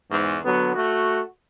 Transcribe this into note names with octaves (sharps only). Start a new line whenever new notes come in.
E2 G#2
D3 F#3 B3
A3 F#4